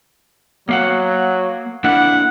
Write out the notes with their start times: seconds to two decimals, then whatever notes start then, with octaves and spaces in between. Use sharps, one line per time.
0.69 F#3 A#3 F5 F#5
1.84 A#3 D4 E4 F#5